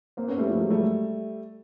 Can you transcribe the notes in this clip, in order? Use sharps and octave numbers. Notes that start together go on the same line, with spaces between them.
A#3 C4
B3 C#4
G3 A3
F3 G3
F#3 G#3
G3 A3